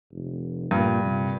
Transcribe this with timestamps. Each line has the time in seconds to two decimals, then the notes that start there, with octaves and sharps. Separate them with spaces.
0.12 F1
0.71 G2 A#2
1.03 C3